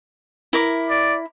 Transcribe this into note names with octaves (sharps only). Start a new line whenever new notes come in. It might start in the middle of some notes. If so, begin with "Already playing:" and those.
E4 A#4 D6
D5